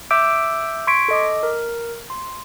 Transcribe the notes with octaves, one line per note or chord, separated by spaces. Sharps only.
E5 D6 E6 G6 D7
C6 C#6 G#6 B6 D7
A4 D#5 D6
A#4
C6